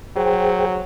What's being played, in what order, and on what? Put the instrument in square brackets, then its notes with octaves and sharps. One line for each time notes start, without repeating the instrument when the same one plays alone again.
[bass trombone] F#3 [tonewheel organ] G#4 C5 G5